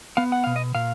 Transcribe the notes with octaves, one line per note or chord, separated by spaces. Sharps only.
B3 F5
F#5
B2 F5
D#5
A#2 F5